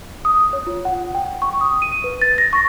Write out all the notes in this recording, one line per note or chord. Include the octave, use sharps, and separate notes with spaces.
D#6
C#5
F4
F#5
G5
C#6
D#6
D#7
B4
A6
A#6
C#6